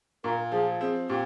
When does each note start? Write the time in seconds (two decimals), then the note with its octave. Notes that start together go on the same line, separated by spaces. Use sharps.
0.24 A#2 A#4
0.52 F3 G#4
0.80 C4 G#4
1.09 A#2 G4